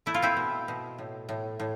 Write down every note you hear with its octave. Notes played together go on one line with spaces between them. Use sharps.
A3 E4
F4
C4 E4
B2
B2
A2
A2
A2